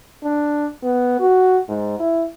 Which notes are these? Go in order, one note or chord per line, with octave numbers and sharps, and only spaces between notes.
D4
B3
F#4
G#2
E4